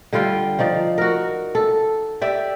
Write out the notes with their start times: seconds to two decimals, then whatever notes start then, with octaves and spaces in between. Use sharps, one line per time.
0.13 D3 G3 F4 G5
0.59 F3 D#4 D5
0.98 F#4 A#4
1.55 A4
2.21 G4 D5 E5